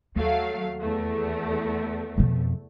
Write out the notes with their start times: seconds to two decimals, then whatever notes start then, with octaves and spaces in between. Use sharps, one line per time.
0.16 D#2 F#3 A3 F5
0.80 E2 A3
2.17 F2 B2